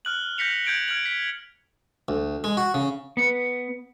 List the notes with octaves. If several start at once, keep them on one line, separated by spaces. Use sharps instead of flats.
F6 F#6 F#7
F6 G6 A#6 B6 C#7 F7
G6 G#6 D7 F#7 G7
F6 G#6 F#7
B6
D2
G#3
F#4
C#3
B3